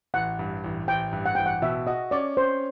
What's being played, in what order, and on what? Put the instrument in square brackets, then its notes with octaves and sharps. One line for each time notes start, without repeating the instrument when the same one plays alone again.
[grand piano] A1 [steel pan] F#5
[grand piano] G2
A1
[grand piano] A1 [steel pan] G5
[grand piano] G2
[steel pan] F#5
[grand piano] A1 [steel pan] G5
[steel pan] F#5
[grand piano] B2 [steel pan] E5
[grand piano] F#4 [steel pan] D#5
[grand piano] C#4 [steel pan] D5
[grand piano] C#4 [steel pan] C5